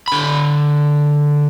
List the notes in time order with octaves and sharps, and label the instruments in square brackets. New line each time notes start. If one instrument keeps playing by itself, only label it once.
[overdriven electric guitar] D3 B5